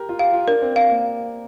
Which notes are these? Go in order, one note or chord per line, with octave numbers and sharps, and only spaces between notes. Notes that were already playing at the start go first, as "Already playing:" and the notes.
Already playing: G4 A#4
F4
G4 F5
F4
D4 A#4
C4
C4 F5
A#3